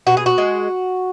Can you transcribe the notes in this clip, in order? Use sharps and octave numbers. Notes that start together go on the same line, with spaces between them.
B2 F#4
G#4
F#4
G#3